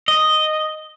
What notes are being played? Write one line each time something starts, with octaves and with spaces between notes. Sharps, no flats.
D#5